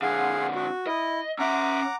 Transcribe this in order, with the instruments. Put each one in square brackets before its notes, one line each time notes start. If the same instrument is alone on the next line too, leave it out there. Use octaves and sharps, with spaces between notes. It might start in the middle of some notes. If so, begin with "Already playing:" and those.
[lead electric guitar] F2 D3 [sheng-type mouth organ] G#4 F5 F#5
[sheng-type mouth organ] F#4
[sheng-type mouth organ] E4 [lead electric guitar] D#5
[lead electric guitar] C#4 E5 [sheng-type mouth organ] F#5 A#5 D6